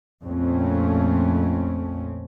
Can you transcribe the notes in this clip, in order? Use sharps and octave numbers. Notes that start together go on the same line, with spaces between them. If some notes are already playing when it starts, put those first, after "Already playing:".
A#1 F2 A3 C4 C#4